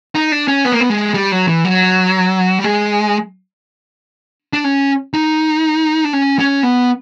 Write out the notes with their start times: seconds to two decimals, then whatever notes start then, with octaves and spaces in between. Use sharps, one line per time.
0.15 D#4
0.32 D4
0.48 C#4
0.65 B3
0.72 A#3
0.80 B3
0.90 G#3
1.14 G3
1.32 F#3
1.48 E3
1.64 F#3
2.59 G3
2.64 G#3
4.53 D4
4.64 C#4
5.14 D#4
6.05 D4
6.13 C#4
6.39 C#4
6.63 B3